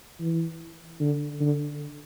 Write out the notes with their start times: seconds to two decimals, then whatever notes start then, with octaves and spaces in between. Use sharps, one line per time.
0.20 E3
1.00 D3
1.40 D3